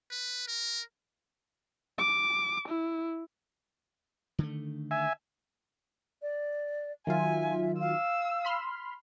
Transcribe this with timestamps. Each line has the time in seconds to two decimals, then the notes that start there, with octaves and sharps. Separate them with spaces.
0.11 B4
0.48 A#4
1.99 D6
2.69 E4
4.39 D3 D#3 A3
4.91 E5 G#5
6.22 D5
7.07 D#3 F#3 F4 E5 G#5
7.80 F5 E6
8.45 B5 C6 F6